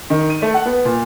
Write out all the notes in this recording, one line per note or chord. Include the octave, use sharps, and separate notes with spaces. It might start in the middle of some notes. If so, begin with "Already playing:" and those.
D#3
D#7
A3
F#5
B3
A#2